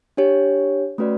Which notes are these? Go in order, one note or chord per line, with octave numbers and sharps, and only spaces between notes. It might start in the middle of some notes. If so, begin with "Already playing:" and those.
D4 G4 C#5
A3 C#4 F#4 B4 D5